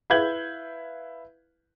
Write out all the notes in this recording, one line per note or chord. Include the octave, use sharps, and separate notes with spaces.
E4 B4 F5 G6 G#6 F#7